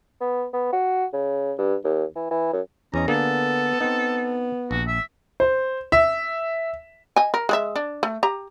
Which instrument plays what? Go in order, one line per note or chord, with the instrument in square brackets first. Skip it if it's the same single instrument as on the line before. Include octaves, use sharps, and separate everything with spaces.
[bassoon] B3
B3
F#4
C#3
G2
D#2
E3
E3
F#2
[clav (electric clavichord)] E2 D#5 [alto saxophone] C#4 [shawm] A#5
[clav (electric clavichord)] D3 A#3 G#4 [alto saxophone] B3 [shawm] A4
[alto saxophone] B3 [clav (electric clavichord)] C4 D#4
[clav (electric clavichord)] A#1 [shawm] F#4
[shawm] E5
[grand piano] C5
E5
[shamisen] D#5 G#5
A#4
G#3 G#4 E5
D4
A3
G4 A#5